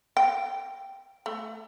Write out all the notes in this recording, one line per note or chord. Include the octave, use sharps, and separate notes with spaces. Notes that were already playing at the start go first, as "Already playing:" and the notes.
G5
A3